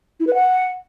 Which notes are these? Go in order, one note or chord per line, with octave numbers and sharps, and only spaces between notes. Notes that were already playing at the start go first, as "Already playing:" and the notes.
E4
B4
F#5